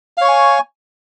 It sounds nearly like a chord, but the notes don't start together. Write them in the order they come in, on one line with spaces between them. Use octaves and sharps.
F5 C#5 C#6 G#5